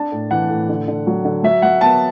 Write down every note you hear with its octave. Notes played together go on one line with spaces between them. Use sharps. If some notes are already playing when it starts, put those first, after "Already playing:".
Already playing: D4 A5
A2
E3 F#5
A2
D3
D3
F#3
D3
F#3 E5
F#3 F#5
B3 A5